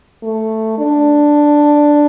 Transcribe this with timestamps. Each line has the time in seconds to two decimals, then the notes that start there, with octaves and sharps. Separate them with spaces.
0.23 A3
0.78 D4